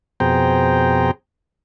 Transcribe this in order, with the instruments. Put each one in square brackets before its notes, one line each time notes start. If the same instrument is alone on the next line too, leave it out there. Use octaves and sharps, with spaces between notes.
[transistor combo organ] F2 B2 G#4 C5 G5 A#5